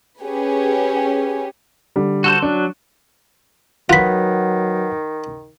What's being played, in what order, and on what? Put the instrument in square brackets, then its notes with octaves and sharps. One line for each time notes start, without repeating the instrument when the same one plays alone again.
[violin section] C#4 G4 G#4 B4
[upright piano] D3 G3
[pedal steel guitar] F#4 A4 C5
[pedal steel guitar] F#3 [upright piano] D4
[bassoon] D#3 [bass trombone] F#3 [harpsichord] F4 B5 [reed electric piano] B4 F#5